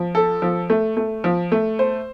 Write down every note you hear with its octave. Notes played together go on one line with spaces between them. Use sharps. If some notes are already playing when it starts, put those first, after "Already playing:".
Already playing: F3
A4
F3
A3
A3
F3
A3
C5